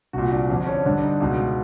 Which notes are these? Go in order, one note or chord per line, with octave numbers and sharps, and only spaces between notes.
C2 A#2 F#4
D4
F2 D3 D4
C#4
G2 D3 D4
D#4
C#2 B2